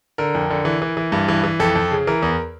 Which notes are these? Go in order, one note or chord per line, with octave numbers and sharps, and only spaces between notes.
D3 A#4
F2
D3
E3
E3
E3
G2
E3
E3
F2 A4
F2
C#3
E3 A#4
E2